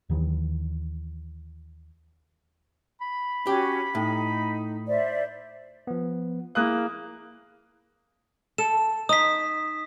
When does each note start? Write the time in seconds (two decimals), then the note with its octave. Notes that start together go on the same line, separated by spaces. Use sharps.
0.10 D#2 D#3 E3 F#3
3.01 B5
3.47 C#4 F#4 G4
3.95 A2 D#4
4.87 C5 D5 E5
5.87 F3 B3
6.55 A#3 E4 G#4 F5 D#6 F#6
8.58 A4 E7
9.09 D#4 D#6 B6